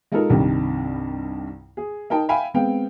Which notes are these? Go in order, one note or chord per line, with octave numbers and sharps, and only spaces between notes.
G#3 D#4 F4 A4 A#4
C2 G2 C3 D#3 G3
G#4
D#4 A#4 G5 A5
E5 F5 G5 G#5 B5
G#3 B3 C4 F5 G5